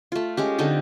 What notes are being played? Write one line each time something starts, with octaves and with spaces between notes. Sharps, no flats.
A3 F4
G#3 C#4 G4
D3 C4 D#4 A4